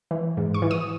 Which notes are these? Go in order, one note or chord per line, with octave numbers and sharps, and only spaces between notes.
E3
G#2
C#6
E3
D#6